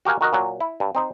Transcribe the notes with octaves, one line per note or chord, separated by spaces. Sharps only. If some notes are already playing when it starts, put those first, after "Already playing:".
F#4 G4 A#4 F5 G#5
D#3 F#4 A#4 D#5
A#2 F#3
E4
G2
C4 D#4 C5